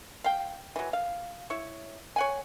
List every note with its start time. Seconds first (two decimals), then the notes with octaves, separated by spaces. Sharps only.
0.24 F5 G5
0.76 E3 F#3
0.93 F5
1.50 E4 C#5
2.16 C#5 F#5 G#5